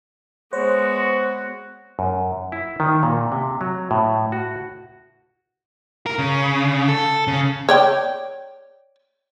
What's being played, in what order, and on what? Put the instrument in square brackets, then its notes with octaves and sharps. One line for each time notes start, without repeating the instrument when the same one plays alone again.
[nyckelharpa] G#3 B3 [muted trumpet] F#4 [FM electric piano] C5 C#5
[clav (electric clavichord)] F#2
E4
D#3
A#2
C3
F#3
A2
F#4
[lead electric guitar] A#4
C#3
A4
C#3
[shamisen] C#5 D5 G5